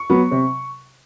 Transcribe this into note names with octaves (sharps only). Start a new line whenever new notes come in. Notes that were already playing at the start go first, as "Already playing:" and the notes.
Already playing: C#6
F#3 B3
C3